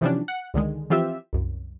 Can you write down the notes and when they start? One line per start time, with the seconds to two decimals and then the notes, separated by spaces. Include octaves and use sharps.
0.01 C3 E3 F3 G3 C#4 D4
0.28 F#5
0.54 C#2 D3 D#3 G#3
0.90 E3 F3 C4 F4 G4 E5
1.33 C2 F#2